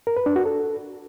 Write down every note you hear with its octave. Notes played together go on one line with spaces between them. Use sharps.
A#4
B4
D4
F#4
A4